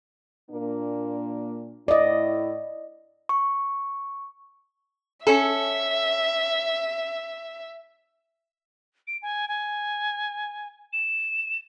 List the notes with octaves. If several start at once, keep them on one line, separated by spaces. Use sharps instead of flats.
A#2 A#3 D4
A2 E4 D5 D#5
C#6
C#4 A4 E5
D7
G#5
G#5
E7